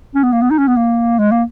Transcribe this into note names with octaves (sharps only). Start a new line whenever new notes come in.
C#4
B3
A#3
B3
D#4
C#4
B3
A#3
G#3
A#3